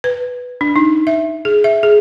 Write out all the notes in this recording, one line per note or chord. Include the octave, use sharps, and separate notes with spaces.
B4
D4
D#4
E5
G#4
E5
G#4